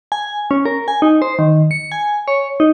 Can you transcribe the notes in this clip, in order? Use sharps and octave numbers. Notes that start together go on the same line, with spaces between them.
G#5
C#4
A#4
G#5
D#4
C5
D#3
C#7
G#5
C#5
D#4